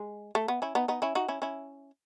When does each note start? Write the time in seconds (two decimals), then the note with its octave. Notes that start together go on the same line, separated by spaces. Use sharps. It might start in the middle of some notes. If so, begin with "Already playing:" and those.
Already playing: G#3
0.35 A3
0.48 B3
0.62 C#4 E4
0.75 B3 D#4
0.88 B3 D#4
1.02 C#4 E4
1.15 D#4 F#4
1.28 C#4 E4
1.42 C#4 E4